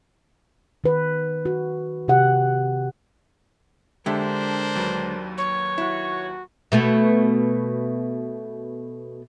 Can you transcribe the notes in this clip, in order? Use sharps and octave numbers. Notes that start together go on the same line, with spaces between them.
D#3 B4
F#4
C3 G4 F#5
D3 G#3 D4 G4 A#4 C5 E5 A5
D#2 F#3 B4
C#5
E4 F#4
B2 A3 B3